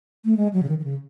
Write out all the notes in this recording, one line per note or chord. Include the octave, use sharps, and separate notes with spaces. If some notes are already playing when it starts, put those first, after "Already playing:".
A3
G#3
F#3
C#3
D#3
D#3
C#3